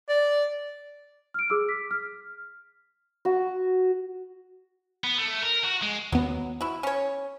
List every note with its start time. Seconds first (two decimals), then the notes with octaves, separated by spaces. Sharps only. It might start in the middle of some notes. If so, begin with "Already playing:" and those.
0.09 D5
1.34 F6 D7
1.50 G#4 D6 E6
1.69 B6
1.91 F6
3.25 F#4
5.04 B3
5.18 A3
5.43 A#4
5.65 F#4
5.83 G#3
6.12 D#2 F#3 B3
6.61 E4 F#4
6.83 C#4 C#5